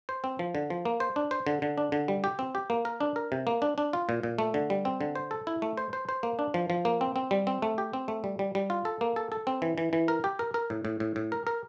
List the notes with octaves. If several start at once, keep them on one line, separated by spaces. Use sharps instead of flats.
C5
C4
F3
D3
F3
A#3
C5
D4
C5
D3
D3
D4
D3
G3
G4
C4
G4
A#3
A#4
D4
A#4
C3
A#3
D4
D4
F4
A#2
A#2
A3
D3
G3
C4
D3
C5
A4
E4
A3
C5
C5
C5
A#3
D4
F3
F3
A#3
C4
C4
G3
C4
A3
G4
C4
A3
G3
G3
G3
F4
A4
A#3
A4
A4
C4
E3
E3
E3
A#4
G4
A#4
A#4
A2
A2
A2
A2
A#4
A#4